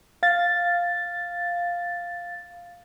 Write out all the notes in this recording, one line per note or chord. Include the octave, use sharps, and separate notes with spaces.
F5 A6